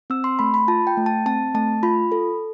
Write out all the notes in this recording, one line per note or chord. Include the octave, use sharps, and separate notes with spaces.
C4 E6
C6
A3 B5
B5
F4 A5
G5
A3
A5
C4 A5
A3 A5
F4 B5
A4